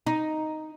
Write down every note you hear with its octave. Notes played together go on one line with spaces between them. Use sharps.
D#4